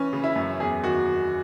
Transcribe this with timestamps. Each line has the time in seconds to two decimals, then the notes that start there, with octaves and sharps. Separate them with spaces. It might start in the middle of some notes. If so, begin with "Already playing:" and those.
Already playing: E3 C#4
0.13 C#3
0.24 E4
0.36 F#2
0.60 E2 G#4
0.84 D#3 F#4
1.08 D#3